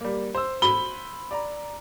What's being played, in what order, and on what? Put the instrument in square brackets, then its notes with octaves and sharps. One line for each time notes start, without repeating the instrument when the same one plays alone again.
[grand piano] G3 A#3
C5 E6
[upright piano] B5 G7
[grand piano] D5 A#5